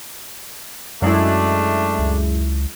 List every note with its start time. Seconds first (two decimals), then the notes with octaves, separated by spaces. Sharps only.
1.02 F#2 F#3 G#3 A3 D4 E4
1.99 C#2